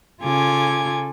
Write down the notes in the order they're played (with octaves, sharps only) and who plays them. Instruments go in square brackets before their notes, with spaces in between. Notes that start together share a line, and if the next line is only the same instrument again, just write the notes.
[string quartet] C#3 F4 A4 G#5 D6 G#6